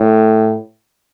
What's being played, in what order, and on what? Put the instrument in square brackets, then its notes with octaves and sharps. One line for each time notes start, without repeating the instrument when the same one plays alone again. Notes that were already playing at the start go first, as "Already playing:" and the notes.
Already playing: [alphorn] A2